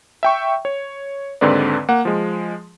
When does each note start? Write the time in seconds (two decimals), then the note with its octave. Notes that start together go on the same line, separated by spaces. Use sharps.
0.23 E5 G5 C#6
0.65 C#5
1.41 D#2 G#2 D3 C4 B4 D5
1.89 A#3 F#5
2.05 F3 G#3